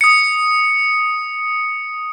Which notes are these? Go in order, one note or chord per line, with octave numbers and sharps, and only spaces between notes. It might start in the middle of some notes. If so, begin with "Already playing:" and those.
D#6 C#7